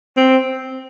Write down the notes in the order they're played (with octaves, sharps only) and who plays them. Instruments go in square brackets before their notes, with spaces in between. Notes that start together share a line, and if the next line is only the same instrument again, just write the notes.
[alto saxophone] C4